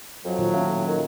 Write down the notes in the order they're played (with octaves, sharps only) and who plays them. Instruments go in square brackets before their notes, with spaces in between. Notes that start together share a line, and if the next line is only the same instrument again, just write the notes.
[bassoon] F2 [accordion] F#3
[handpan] A#2 D#3 F4
[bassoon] A2 [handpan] C#4 F5
[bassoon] D#3